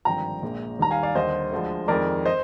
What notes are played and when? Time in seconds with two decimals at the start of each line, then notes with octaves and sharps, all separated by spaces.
0.05 G#1 G2 D3 F3 G5 A#5
0.43 A#1 A#2 G#3
0.79 D#2 D#3 G3 A#5
0.91 F5 G#5
1.03 D5 F5
1.15 D#2 D3 G3 C5 D#5
1.51 D2 D3 F3 G#3
1.88 F2 D#3 G#3 A#4 D5
2.25 C5 D#5